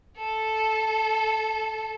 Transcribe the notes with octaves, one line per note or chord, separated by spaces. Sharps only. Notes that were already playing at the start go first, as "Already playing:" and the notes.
A4